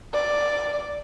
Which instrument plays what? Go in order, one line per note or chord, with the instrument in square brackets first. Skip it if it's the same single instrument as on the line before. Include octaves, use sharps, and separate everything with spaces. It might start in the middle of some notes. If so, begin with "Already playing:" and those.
[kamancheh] D5